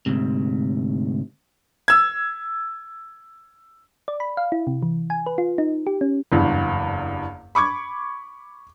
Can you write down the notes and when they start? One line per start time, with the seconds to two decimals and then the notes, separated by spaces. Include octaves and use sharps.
0.06 D2 G#2 C3
1.88 E6 G#6
4.08 D5
4.20 B5
4.37 F5
4.52 E4
4.67 C3
4.82 E3
5.10 G#5
5.26 B4
5.38 F4
5.58 D#4
5.87 G4
6.01 C#4
6.32 F#1 E2 G2
7.55 B5 C#6 D6 G#6